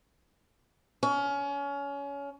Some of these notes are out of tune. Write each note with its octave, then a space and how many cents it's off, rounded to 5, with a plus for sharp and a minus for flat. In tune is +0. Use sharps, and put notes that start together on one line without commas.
C#4 +25